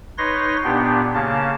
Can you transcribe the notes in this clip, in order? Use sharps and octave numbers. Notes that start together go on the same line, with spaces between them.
D#4 B4 C#5 C6 A#6
A#2 B3 D4 G4
C#3 A#3 A5